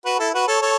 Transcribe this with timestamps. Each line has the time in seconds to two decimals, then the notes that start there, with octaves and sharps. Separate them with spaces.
0.05 F#4 B4
0.19 E4 A4
0.34 F#4 B4
0.48 A4 C#5
0.61 A4 C#5